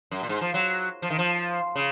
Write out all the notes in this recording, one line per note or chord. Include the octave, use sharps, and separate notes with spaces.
F#2
A#2
G#2
F3
F#3
F3
D#3
F3
C#3